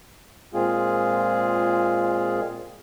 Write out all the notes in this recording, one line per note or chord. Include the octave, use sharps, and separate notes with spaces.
A#2 G#3 C4 F4 G#4